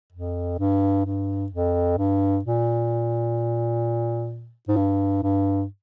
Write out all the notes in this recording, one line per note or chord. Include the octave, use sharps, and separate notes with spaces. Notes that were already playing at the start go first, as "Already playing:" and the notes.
F2
G2
G2
F2
G2
A#2
G#2
G2
G2